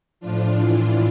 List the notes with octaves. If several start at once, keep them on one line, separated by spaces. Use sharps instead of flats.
A2 F3 D4 F4
A2 E3 D4 F4